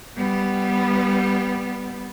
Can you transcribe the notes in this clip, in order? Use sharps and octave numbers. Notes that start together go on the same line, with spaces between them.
G3 B3